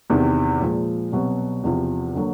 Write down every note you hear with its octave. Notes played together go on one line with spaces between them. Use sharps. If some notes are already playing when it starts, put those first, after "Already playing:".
E2 C3 D#3
A#2 F3 G#3
C2 B2 F#3
E2 C3 F3
D3 F#3 A#3